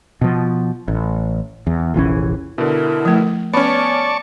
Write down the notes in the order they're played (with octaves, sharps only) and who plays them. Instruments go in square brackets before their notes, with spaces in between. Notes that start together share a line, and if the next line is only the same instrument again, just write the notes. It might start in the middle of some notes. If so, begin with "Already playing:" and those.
[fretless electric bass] B2 F3
A1
E2
F1 A#1 E3 C#4
[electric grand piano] B2 D3 [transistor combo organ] E4 [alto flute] A#4
[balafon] F3 A3
[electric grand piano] B3 C#4 [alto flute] C#5 [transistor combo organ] D5 A5 C#6 [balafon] B5